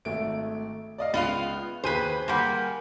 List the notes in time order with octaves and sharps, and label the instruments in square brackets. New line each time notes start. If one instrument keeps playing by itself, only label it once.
[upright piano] G#1 A3 D7
D5 D#5 F5
[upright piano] C#2 [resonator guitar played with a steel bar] B3 F4 F5
[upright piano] D#2 G#4 D#7 [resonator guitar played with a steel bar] B4 C5
[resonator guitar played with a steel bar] G3 A#3 [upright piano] F#5 G#5 C6